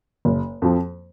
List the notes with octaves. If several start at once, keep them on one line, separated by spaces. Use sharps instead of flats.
F#1
F2 F3